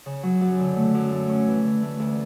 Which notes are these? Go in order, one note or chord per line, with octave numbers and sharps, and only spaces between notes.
C#3
F#3
F#2
D3
A3
F#2
A3
C#4
E3
D3
A3
D2